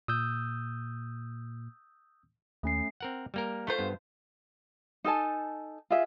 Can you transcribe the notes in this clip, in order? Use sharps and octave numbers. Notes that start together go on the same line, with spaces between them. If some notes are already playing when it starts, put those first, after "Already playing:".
A#2 D#6 E6 G6
D#2 A3 C#4 C7
C4 A#4 F#5
G3 A#3 A#4
A3 F4 C5
G2 B3
D#4 A4 G#5 A5
F4 G#4 E5